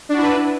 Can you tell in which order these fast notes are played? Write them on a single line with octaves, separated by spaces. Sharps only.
D4 F#4 E4 B4